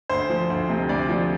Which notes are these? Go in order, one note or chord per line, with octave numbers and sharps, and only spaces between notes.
D2 C5
F3
D2
C3
D2 D5
F3